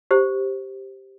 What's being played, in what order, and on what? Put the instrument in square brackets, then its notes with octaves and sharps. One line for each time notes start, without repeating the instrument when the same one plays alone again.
[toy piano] G4 C5